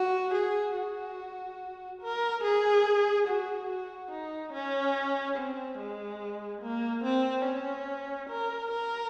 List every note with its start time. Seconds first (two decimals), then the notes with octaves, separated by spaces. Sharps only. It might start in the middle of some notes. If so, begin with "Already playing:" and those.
Already playing: F#4
0.34 G#4
0.76 F#4
2.01 A#4
2.44 G#4
3.27 F#4
3.70 F#4
4.12 D#4
4.53 C#4
5.37 C4
5.78 G#3
6.62 A#3
7.04 C4
7.46 C#4
8.29 A#4
8.71 A#4